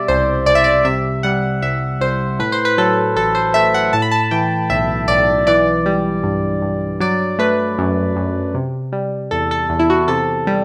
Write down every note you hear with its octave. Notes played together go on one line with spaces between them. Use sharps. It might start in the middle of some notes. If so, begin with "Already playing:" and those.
Already playing: B2 G3 D5 E5
C2 C5
C2 D5
E5
D5
C3 E5
G3 F#5
C2 E5
C2 C5
A2 B4
C5
B4
F#3 A4
A1 A4
C5
A3 E5
F#5
A2 A5
B5
A5
E3 G5
B1 E5
B1 D5
E3 D5
G3
G2
G2
F#3 D5
A3 B4
F#2
F#2
C3
G3
E2 A4
A4
E2
E4
F#4
C3 A4
G3